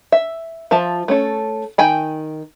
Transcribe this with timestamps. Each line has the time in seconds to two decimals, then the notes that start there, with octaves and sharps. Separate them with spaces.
0.12 E5
0.71 F3 F4 E5 A5
1.08 A3 C#4 A4
1.78 D#3 G5 G#5 B5